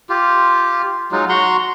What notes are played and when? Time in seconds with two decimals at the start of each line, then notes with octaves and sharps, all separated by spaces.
0.10 F4 G4
1.12 F#3 G#3 D#4 F4
1.29 F#4 A#5 C6 C#6